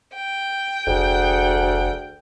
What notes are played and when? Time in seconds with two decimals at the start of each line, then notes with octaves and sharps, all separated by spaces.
0.15 G5
0.87 F1 D2 G#4 F#5